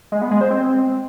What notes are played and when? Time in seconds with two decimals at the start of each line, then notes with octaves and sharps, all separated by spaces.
0.12 G#3
0.22 B3
0.31 G#3
0.41 C5
0.51 C4